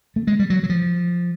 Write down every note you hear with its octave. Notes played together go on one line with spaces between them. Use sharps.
A3
G#3
G3
F#3
F#3
F3